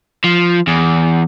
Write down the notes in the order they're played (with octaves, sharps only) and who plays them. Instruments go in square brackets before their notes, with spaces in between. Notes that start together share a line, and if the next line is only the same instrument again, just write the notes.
[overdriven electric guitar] F3
E2